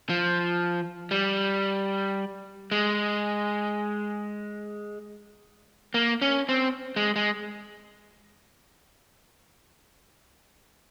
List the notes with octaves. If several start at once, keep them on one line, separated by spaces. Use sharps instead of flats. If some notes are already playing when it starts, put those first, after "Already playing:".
F3
G3
G#3
A#3
C#4
C4
G#3
G#3